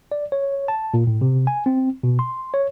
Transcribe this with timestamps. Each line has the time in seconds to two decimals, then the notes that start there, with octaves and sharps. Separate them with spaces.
0.12 D5
0.32 C#5
0.68 A5
0.94 A#2
1.07 A2
1.21 C3
1.47 G#5
1.66 C4
2.03 B2
2.19 C6
2.54 C#5